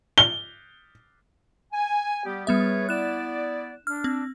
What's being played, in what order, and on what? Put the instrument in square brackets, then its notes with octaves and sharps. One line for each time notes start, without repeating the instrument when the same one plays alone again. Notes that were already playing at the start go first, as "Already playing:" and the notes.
[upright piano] G7
[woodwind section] G#5
G3 B3 G4
[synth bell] G3 B3 E5 [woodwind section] G#4 B4 C#5
[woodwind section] B3 E4 D5 [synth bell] F#6 E7
[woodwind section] D4 [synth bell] F6
[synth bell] C4